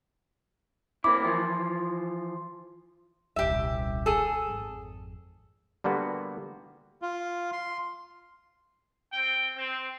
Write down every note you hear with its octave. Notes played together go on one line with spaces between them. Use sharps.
A#3 C4 E4 D6
E3 F3 F4
D#1 C2 G4 E5
G#4 A4
G#1 F2
D3 G3 A#3 B3 F#4
F4
C6
C4 G5
C4